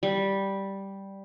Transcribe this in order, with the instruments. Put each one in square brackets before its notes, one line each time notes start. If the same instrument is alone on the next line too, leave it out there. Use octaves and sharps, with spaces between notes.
[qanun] G3